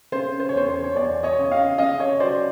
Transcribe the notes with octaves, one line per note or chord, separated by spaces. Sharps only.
C#3 C5
C5
C#5
E2 C5
C5
C#5
E2 C5 D5
C#5 D#5
C#3
D#5 F5
C#3 D#5 F5
C#5 D#5
F#3 C5 D5